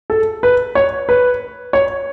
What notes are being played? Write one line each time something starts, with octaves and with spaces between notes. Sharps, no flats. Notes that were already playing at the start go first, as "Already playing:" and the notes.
A4
B4
C#5
B4
C#5